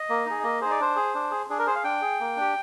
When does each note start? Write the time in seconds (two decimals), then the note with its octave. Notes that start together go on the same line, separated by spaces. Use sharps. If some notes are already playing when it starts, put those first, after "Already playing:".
Already playing: D#5
0.10 A#3
0.26 D#4 G#4
0.44 A#3 D#5
0.61 D#4 G#4 C5
0.71 D5
0.80 D4 C5
0.96 G#4
1.15 D4
1.31 G#4
1.49 D4 G#4
1.59 A#4
1.66 G#4 C5
1.75 F5
1.84 D4 G5
2.02 G#4
2.20 A#3
2.36 D4 G4